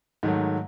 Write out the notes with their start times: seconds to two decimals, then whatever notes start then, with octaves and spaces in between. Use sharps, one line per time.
0.23 G#2 D#3 F#3 A3